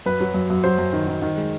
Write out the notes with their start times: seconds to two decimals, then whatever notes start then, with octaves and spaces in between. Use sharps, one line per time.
0.06 F#2 B4
0.20 F#3
0.34 F#2
0.50 F#2
0.64 F#3 C5
0.78 F#2
0.93 D#3
1.07 D#3
1.22 D#3
1.37 G#3